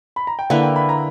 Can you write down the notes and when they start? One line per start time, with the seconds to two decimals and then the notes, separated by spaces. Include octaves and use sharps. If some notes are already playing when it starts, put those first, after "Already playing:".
0.16 B5
0.27 A#5
0.39 G5
0.50 D3 A#3 E4 B4 F#5
0.63 G5
0.76 B5
0.89 A#5